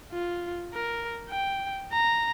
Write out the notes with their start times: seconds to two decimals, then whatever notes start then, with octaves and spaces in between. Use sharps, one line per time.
0.12 F4
0.73 A#4
1.30 G5
1.92 A#5